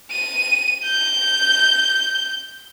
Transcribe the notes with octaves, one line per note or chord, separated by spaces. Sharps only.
D#7
G6